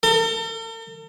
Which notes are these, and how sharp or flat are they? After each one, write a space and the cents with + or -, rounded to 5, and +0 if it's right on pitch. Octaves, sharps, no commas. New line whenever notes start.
A4 +45